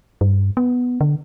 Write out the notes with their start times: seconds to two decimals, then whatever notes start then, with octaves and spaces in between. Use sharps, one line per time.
0.21 G2
0.57 B3
1.01 D3